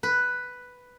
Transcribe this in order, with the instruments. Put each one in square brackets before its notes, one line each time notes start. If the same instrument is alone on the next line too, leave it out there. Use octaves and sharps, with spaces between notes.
[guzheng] B4